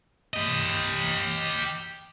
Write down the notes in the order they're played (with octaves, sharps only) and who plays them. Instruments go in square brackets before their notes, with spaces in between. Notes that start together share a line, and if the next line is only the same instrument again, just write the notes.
[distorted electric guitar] G4 D#5